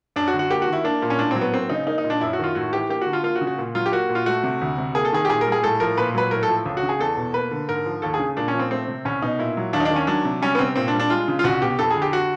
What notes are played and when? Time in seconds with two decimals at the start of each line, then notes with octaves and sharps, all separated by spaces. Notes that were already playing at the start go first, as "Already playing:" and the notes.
0.16 F#2 D4
0.28 F#4
0.33 D3
0.39 F#4
0.50 A#3 G4
0.62 F#4
0.67 D#3
0.73 E4
0.84 A#3 D4
1.02 A#2
1.10 C#4
1.19 A2 D4
1.31 F#3 C4
1.41 B3
1.53 A#3 C4
1.70 C#3 D#4
1.87 A#3 D#4
1.98 D#4
2.04 A#2
2.10 D4
2.21 F#2 E4
2.33 F#4
2.39 D#3 F4
2.55 A2 F#4
2.73 E3 G4
2.89 A#3 G4
3.01 D3 F#4
3.13 F4
3.23 A#3 F4
3.36 F#4
3.41 C#3
3.47 F#4
3.58 A#2
3.75 F#3 F4
3.86 G4
3.92 A#3 F#4
4.09 A#2
4.15 F4
4.26 A3 F#4
4.44 C3
4.61 D2
4.78 C3
4.95 A#3 G#4
5.05 A4
5.12 D#3 G#4
5.25 G4
5.29 A#2 G#4
5.41 A#4
5.46 G3
5.52 G#4
5.63 A2 A4
5.80 F3 A#4
5.97 A#2 B4
6.15 F#3 B4
6.31 A2 A#4
6.43 A4
6.49 F3
6.66 C#2
6.77 F#4
6.83 C#3
6.89 G#4
6.99 E2 A4
7.17 B2
7.34 A#3 B4
7.51 D3
7.68 G#2 A#4
7.86 F3
8.02 D#2 A4
8.14 G#4
8.20 C#3
8.37 A#2 D4
8.48 C#4
8.54 F3
8.59 C4
8.71 A3 C4
8.88 C3
9.05 C2 C#4
9.22 B2 D#4
9.39 A#2 E4
9.57 F#3
9.73 D#2 D4
9.80 D#4
9.85 D4
9.91 D#3
9.96 C#4
10.07 F#3 D4
10.25 C3
10.42 G3 C#4
10.55 B3
10.59 C3 C4
10.76 A#2 C4
10.88 D4
10.94 G3
11.00 D4
11.10 G#3 F4
11.28 C#3
11.39 F4
11.44 C2 F#4
11.62 B2 G4
11.79 F2 A4
11.91 G#4
11.96 D3
12.02 G4
12.13 F#4